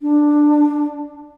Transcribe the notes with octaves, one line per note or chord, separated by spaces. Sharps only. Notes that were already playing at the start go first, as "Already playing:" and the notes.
D4